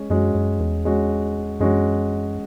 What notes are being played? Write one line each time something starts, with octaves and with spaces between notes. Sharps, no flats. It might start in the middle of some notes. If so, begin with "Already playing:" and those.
Already playing: G#3 C#4
F#2 G#3 C#4 F#4
F#2
E2
G#3 C#4 F#4
F#2 G#3 C#4 F#4